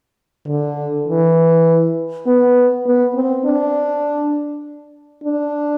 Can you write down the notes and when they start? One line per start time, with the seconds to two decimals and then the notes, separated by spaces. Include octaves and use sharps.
0.48 D3
1.08 E3
2.26 B3
2.86 B3
3.15 C4
3.45 D4
5.24 D4